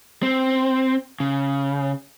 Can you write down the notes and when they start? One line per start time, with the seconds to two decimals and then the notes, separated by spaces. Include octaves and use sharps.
0.23 C4
1.20 C#3